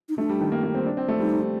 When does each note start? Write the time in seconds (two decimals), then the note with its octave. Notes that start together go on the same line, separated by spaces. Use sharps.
0.09 D#4
0.18 A3 D4
0.29 G3
0.41 D#3
0.52 A#3
0.63 A#3
0.74 C4
0.86 D4
0.97 C4
1.09 A3
1.19 G3 D#4